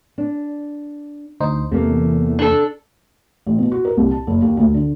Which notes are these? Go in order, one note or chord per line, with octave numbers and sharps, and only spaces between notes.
D4
D2 D#4 C5
E2 C3 A3 A#3
D4 A4
A1
B2
F#4
A#4
C2
A5
F#1
D#2
D2
D3